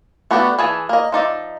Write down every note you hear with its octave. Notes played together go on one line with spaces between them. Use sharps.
A3 B3 D4 F#4 G4
E3 G#4 A5
A#3 D#5
F3 D#4 D5 E5